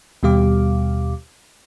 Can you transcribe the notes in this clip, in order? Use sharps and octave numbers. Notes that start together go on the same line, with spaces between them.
D#2 B2 G3 G4 F5 D6